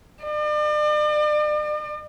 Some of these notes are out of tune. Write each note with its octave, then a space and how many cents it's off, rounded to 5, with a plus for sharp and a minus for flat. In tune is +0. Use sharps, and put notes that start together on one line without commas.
D5 +40